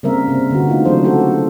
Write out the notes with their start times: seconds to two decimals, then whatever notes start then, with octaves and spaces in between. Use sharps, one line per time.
0.03 C#3 G3 A#3 C4 A#4 E5
0.28 C3 C4
0.51 D3 B3 F#4
0.68 A3 D#4 F4
0.85 C#3 E3 F#3 D4 C5
1.04 F#4 G4 A4 C5